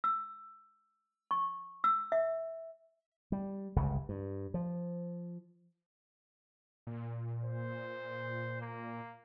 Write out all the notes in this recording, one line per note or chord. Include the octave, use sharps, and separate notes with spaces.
E6
C#6
E6
E5
G3
G1 C#2 C#3
G2
F3
A#2
C5
A#3